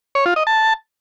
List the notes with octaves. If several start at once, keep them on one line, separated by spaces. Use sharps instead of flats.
C#5
F4
D#5
A5